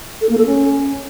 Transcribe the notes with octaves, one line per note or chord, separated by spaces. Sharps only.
A4
A#3
A4
C#4